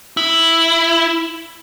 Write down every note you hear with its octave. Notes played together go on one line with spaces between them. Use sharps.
E4